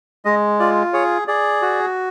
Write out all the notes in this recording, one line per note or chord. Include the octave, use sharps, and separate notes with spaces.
G#3 D#5
F4 D5
G#4 C#5
G#4 D5
F#4